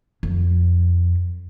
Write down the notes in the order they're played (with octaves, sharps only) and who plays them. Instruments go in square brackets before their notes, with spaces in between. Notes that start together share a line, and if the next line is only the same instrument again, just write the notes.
[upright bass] F2